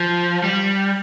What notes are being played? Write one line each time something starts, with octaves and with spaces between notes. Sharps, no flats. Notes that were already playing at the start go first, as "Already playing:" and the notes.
Already playing: F3
G3